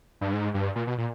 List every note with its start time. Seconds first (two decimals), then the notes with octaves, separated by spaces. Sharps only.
0.21 G2
0.33 G#2
0.54 G2
0.76 A#2
0.87 B2
0.98 A#2